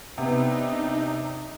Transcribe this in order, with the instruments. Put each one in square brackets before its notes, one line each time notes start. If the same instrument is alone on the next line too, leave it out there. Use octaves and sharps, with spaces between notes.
[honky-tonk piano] C3 [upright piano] B3 [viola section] D4 D#4